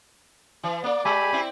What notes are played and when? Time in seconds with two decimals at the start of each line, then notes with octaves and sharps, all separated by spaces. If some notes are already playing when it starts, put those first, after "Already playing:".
0.63 E3
0.84 A#3 D5
1.05 G#3 G4 G#5 B5
1.33 C4 E4